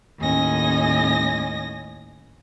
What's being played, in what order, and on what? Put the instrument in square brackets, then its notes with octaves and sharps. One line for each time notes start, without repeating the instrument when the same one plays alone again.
[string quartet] D#2 A2 C#4 D#5 G#5 A#6